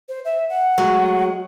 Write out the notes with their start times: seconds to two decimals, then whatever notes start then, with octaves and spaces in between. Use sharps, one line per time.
0.09 C5
0.25 E5
0.49 F#5
0.78 F#3 G#3 A3